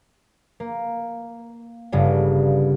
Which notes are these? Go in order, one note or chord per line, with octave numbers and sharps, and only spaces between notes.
A#3
G1 G2 C#3